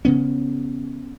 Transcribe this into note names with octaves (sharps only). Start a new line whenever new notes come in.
C#3 B3 C#4